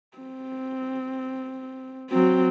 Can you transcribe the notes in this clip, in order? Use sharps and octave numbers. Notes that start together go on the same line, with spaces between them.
C4
F#3 C4